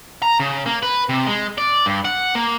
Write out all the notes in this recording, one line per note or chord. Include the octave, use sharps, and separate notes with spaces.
A#5
C#3
A#3
B4
C3
G#3
D5
G2
F#5
A#3